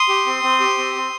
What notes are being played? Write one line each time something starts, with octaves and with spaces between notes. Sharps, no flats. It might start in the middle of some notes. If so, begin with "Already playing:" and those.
Already playing: C6 D#6
G4
C4
C4
G4
C4
C4